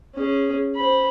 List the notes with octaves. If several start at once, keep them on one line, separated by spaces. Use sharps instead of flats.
C#4 G#4
C5 B5